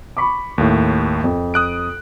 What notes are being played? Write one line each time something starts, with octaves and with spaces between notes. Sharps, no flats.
B5 C#6 D6
D#2 A2
F2
D#6 F#6 D7